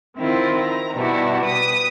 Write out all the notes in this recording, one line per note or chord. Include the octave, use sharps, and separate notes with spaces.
D#3 C4 E4 F4
A#5
G2 B2 G3 E4 F#4
B4 D#6